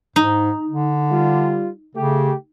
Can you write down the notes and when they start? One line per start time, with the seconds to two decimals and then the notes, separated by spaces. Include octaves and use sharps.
0.16 G#2 D#4
0.69 D3
1.11 G3 F4
1.95 C#3 A3 G4